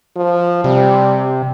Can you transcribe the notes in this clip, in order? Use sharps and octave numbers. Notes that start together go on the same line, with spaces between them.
F3
C3 G3